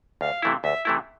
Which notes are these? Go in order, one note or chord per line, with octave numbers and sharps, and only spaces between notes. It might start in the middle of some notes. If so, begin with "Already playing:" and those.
D2 F5
C3 E3 A3 E4
D2 E5
C3 E3 A3 E4